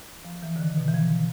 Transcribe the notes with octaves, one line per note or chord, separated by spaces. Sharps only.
F3
E3
D3
D#3
B2
E3
F3